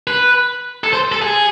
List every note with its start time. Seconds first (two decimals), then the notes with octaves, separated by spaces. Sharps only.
0.07 B4
0.84 A4
0.93 C5
1.12 A4
1.22 G#4